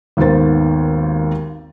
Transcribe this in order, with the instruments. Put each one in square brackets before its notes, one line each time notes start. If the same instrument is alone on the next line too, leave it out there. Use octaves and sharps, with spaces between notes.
[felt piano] G#1 D#2 D#3 B3 C5 A6